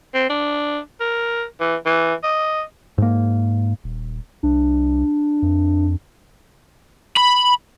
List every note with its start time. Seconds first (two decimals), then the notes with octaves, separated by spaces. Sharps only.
0.14 C4
0.30 D4
1.00 A#4
1.60 E3
1.86 E3
2.23 D#5
2.98 G#2 A#3
3.84 D#1
4.43 C2 D4
5.42 F2
7.17 B5